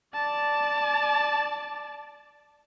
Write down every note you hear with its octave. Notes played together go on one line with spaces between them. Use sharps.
D5 A5